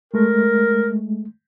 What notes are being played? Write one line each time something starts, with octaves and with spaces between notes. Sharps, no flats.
G#3 A3 A#4